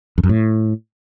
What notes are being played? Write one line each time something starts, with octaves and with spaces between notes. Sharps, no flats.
F2
F#2
A2